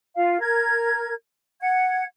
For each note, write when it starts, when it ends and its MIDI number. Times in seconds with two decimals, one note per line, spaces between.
0.16 0.40 65
0.16 0.40 77
0.40 1.14 70
0.40 1.14 92
1.60 2.04 78
1.60 2.04 92